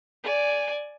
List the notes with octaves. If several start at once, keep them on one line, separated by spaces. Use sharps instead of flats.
D5 G#5